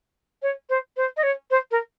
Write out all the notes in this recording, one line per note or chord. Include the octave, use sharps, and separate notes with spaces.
C#5
C5
C5
D#5
C#5
C5
A#4